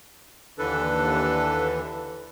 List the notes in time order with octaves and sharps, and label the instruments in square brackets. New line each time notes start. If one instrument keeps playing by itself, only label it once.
[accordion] D#2 D3 E3 [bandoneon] D4 A4 B4